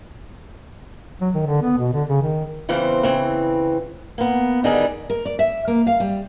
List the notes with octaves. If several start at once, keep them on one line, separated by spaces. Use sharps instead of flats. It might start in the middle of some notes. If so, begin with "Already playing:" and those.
F#3
D#3
D3
B3
B2
D3
C#3
D#3
E2 C#3 E3 C4 C5 F5
C#3 E3 C4
A#3 B3
D3 D#3 G3 D#4 G#4 A#4
A#4
D5
E5
A#3
F5
G3